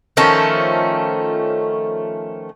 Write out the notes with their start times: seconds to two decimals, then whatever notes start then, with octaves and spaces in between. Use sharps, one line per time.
0.17 D#3 F3 A3 C#4